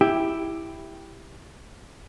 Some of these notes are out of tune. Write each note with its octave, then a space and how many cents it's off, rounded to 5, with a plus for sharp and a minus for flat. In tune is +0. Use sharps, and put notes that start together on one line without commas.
E4 +0 G4 +10